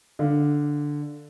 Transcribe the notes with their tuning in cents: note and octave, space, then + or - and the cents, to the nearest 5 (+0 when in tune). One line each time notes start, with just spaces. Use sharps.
D3 +0 F5 +0